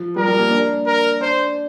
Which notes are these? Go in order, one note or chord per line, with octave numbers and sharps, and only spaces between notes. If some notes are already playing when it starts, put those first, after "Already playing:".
Already playing: F3
G3 A#4
G3
A#3
D4
A#4
D4 C5